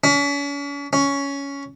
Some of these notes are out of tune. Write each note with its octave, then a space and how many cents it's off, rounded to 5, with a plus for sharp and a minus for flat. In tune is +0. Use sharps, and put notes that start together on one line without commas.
C#4 +40
C#4 +10